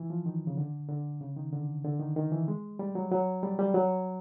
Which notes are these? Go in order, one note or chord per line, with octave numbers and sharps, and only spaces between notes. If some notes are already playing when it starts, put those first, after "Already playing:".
Already playing: E3
F3
D#3
C#3
D3
D3
C#3
D#3
D3
D3
D#3
D#3
E3
G#3
G3
F#3
F#3
G3
G3
F#3